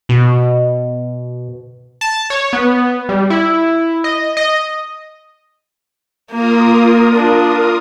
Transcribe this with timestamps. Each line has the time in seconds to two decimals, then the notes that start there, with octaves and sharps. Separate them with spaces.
0.09 B2
2.01 A5
2.30 C#5
2.53 B3
3.09 G3
3.30 E4
4.04 D#5
4.37 D#5
6.32 A#3 F4 A#4 D#6
7.15 D4